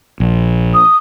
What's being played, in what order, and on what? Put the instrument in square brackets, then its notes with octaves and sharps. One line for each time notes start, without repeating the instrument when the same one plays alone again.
[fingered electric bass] A#1
[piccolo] D#6